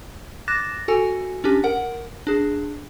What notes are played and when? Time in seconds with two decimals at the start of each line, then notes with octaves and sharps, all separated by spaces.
0.48 D6 F#6 A6 A#6 E7
0.88 F#4 A4 G#5
1.44 C#4 D4 G4
1.64 A#4 F#5
2.27 D4 G#4